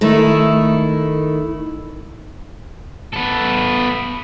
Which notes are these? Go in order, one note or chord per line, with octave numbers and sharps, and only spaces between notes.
D#3 A3 E4
B3 A4